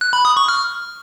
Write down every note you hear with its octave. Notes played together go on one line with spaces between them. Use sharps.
F#6
B5
D#6
C#6
F6